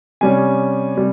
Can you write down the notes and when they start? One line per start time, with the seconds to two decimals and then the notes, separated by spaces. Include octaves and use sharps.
0.21 C3 G3 C#4 G#5
0.97 C3 G3